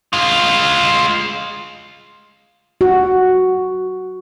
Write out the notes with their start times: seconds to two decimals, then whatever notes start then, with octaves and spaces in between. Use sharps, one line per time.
0.13 G#3 F4
2.81 F#4